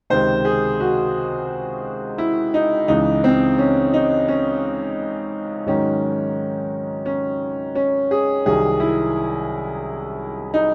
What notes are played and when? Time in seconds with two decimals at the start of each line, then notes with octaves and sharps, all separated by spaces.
0.10 C#2 C3 D#3 C5
0.45 G#4
0.80 F#4
2.18 E4
2.54 D#4
2.88 C#2 C#3 E3 D#4
3.24 C4
3.58 C#4
3.94 D#4
4.28 C#4
5.66 G#2 D#3 F#3 C#4
7.06 C#4
7.75 C#4
8.11 G#4
8.45 C2 C3 D#3 F#3 G#4
8.80 E4
10.54 D#4